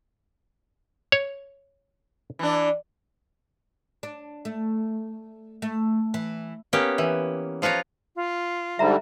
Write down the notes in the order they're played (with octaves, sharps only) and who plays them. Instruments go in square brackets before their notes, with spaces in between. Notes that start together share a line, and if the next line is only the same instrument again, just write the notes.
[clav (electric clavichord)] C#5
[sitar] E3 D4
[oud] D4
A3
A3
E3
[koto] A#3 B3 C#4 G4
E3
F3 F4 B4 C#5 A#5
[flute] F4
[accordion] G#2 D3 G3 [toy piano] E5 A#5